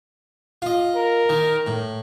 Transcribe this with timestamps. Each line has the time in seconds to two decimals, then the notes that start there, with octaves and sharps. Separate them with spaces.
0.62 F4 D#5
0.96 A#4
1.29 D#3
1.67 A2